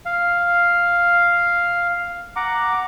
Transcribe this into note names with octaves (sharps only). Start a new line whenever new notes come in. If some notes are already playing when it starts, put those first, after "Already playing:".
F5
F#5 A#5 D6